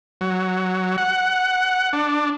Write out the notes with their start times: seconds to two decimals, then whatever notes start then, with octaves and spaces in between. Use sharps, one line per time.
0.21 F#3
0.98 F#5
1.93 D4